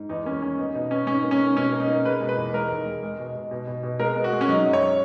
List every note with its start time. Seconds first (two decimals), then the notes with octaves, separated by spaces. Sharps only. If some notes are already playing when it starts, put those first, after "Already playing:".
Already playing: G#2
0.09 E2 D#4
0.25 A#3 C#4
0.42 D#3 C#4
0.58 B3 D#4
0.74 B2 D#4
0.90 B3 C#4
1.07 G#2 C#4
1.23 A#3
1.31 C#4
1.40 G#2
1.56 B2 C#4
1.72 A#3
1.80 D#4
1.89 A#3
2.05 G#3 B4
2.21 B2
2.29 B4
2.37 E2
2.54 G#3 A#4
2.70 D#2
2.86 G#3
3.03 G#3
3.19 B2
3.36 B2
3.51 B2
3.67 B2
3.83 B2
3.99 G#3 A#4
4.16 B3
4.24 F#4
4.33 G#3
4.41 C#4
4.48 F#3 D#4
4.66 F#2
4.73 C#5